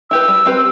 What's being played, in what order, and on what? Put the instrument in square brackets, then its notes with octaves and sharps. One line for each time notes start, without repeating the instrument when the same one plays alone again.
[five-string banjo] E4 G4 B4 [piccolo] E6
[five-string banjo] G3
C4 G4 B4